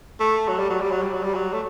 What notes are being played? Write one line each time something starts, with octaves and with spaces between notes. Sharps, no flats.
A3
F#3
G3
F#3
G3
F#3
G3
F#3
G3
F#3
A3